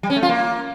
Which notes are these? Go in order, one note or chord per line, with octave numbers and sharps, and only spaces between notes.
G3
C#4
A3
F4
A#3